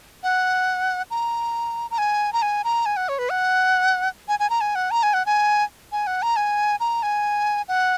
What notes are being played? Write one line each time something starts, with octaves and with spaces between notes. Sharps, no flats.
F#5
A#5
A#5
G#5
A#5
G#5
A#5
G#5
F#5
C#5
B4
F#5
G#5
G#5
A#5
G#5
F#5
A#5
G#5
F#5
G#5
G#5
F#5
A#5
G#5
A#5
G#5
F#5